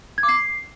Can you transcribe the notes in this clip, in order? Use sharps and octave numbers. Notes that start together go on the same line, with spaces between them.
G#6
D6
C7